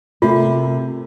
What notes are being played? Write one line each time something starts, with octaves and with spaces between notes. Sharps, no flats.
C3 A3 A#3 F4